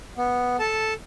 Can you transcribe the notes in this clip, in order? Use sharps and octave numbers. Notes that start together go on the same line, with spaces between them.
B3
A4 A5